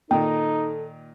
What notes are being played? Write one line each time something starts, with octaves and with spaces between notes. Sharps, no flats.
A#2 D#3 D#4 A4 G5